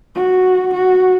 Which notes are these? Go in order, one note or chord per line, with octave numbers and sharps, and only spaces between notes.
F#4
F#4